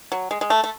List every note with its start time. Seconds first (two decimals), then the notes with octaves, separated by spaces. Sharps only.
0.12 F#3
0.31 G#3
0.41 G#3
0.50 A3
0.64 A3